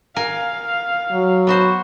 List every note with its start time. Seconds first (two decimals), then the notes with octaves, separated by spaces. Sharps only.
0.16 A#4 F5 G#5
1.12 F#3
1.47 B3 F#4 C5